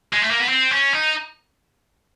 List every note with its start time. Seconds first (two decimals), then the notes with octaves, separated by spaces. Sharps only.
0.13 G#3
0.22 A3
0.31 A#3
0.40 B3
0.49 C4
0.71 C#4
0.93 D#4